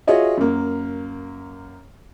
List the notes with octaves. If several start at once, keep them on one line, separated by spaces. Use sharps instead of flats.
F4 F#4 G#4 C#5 D#5 E5
F#2 A#3